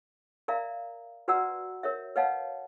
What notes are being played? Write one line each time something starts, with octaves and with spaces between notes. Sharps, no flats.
A#4 D5 E5 F5 A#5
F#4 B4 D5 F#5 A#5 E6
A#4 C#5 E5
B4 C#5 D#5 F5 F#5 A5